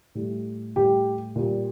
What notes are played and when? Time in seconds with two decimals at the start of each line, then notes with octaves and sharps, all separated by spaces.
0.15 A2 G3
0.76 A2 G3 G4
1.36 A#2 G3